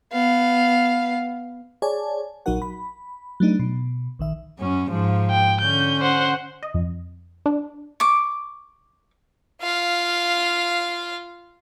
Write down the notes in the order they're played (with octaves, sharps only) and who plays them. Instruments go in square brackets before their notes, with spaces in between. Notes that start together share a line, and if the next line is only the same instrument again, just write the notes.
[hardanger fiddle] B3 F5
[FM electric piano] G#4 C#5 D5 G#5 A5
A#1 F#3 D#4 F#4 A#4 F#5
B5
F#3 A3 D4 D#4
B2
A#1 D#3 E5
[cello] F#2 C#4
G#2 F3
[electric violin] G5
[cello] D3 C#4 [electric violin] G6
[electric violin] C5 F#5
[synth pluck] D#5
F2
D4
[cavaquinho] C#6 D6
[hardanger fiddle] F4 F5